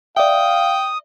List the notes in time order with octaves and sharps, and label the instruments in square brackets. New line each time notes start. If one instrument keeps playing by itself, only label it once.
[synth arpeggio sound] D5 E5 [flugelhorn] F5 [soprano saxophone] G5 [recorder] D#6